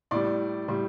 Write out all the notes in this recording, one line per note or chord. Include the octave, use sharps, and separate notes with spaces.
A2 G3 D5
A2 G3